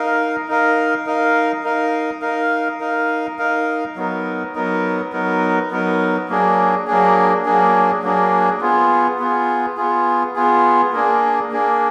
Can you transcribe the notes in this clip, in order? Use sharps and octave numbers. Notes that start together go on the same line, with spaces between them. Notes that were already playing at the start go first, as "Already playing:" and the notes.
Already playing: D#4 A#4 F5
D#4 A#4 F5
D#4 A#4 F5
D#4 A#4 F5
D#4 A#4 F5
D#4 A#4 F5
D#4 A#4 F5
F#3 B3 D#4 A#4
F#3 B3 D#4 A#4
F#3 B3 D#4 A#4
F#3 B3 D#4 A#4
F#3 A#3 D4 G#4
F#3 A#3 D4 G#4
F#3 A#3 D4 G#4
F#3 A#3 D4 G#4
B3 F4 G#4
B3 F4 G#4
B3 F4 G#4
B3 F4 G#4
A#3 D4 G#4
A#3 D4 G#4